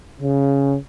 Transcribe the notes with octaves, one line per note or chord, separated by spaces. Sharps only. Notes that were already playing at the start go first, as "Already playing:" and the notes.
C#3